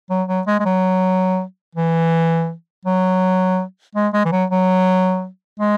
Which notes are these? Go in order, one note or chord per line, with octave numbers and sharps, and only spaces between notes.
F#3
F#3
G#3
G#3
F#3
E3
F#3
G#3
G#3
E3
F#3
F#3
G#3